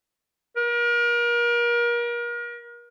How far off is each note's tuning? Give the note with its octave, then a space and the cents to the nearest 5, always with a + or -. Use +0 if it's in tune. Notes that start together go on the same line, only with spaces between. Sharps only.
A#4 +35